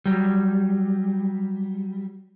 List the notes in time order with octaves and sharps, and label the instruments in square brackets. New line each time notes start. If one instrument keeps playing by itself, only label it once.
[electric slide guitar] F#3 G3